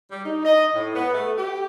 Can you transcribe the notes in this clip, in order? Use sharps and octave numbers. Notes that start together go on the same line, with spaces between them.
G3
D#4
D#5
A2
B3
A3
G4